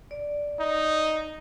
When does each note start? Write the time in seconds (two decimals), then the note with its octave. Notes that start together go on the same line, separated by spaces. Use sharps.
0.11 D5
0.60 D#4